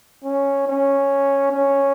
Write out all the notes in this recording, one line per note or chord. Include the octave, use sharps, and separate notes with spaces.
C#4
C#4
C#4